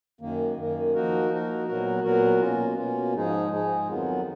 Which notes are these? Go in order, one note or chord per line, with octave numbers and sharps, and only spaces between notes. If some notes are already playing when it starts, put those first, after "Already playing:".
F#2 D#3 A#3
F#2 D#3 A#3
F3 A#3 D#4 F#4 A#4
F3 A#3 D#4 F#4 A#4
A#2 F#3 B3 F#4 A#4
A#2 F#3 B3 F#4 A#4
B2 A#3 C#4 F4
B2 A#3 C#4 F4
G#2 F3 G#3 D#4 G#4
G#2 F3 G#3 D#4 G#4
F2 D#3 F#3 B3 F4